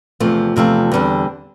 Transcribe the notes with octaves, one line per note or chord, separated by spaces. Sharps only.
E2 C3 F3 A3
E2 C3 F3 A3
E2 D3 G3 C4